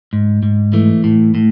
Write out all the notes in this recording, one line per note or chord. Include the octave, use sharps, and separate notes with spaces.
G#2
G#2
E3 A3
A2
A2